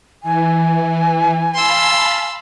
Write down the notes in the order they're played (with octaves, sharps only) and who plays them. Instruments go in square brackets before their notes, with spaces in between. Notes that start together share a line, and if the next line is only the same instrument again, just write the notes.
[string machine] E3 [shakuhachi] G#5
[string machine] F5 A5 B5 [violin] C6 E6